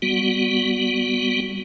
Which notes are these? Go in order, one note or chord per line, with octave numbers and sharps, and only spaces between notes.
G3 B3 F#4